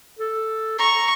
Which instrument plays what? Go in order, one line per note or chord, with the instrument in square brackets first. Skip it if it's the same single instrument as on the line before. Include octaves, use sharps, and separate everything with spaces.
[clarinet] A4
[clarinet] A#5 [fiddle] C#6